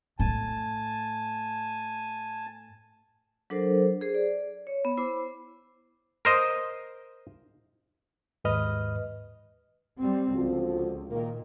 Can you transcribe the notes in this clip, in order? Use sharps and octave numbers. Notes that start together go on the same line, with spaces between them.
A2 G#5 A5
F#3 D4 A4 A#4 C5
G#4 C5
D5
C#5
B3
E4 C5 B5 D6
A#4 C5 D#5
D#2 G#2 B4 D#5 F6
G3 C4
C#2 D3 F3 F#4
A#2 D#3 A#3 A#4